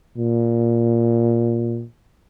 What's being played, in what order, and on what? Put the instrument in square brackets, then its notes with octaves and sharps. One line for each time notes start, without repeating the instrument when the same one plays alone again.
[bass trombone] A#2